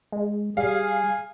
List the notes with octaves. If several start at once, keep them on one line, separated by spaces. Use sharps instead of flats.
G#3
G3 G#4 F5